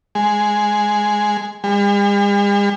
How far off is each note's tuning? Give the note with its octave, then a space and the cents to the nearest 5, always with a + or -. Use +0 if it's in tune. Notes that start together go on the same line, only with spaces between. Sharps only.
G#3 +5
G#3 -45